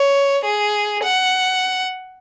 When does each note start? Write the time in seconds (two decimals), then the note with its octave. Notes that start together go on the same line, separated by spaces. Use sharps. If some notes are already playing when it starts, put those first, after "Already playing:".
Already playing: C#5
0.45 G#4
1.03 F#5